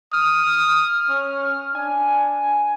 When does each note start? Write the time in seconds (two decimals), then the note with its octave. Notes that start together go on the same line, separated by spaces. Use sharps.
0.13 D#6 F6
1.09 C#4
1.75 D4 G#5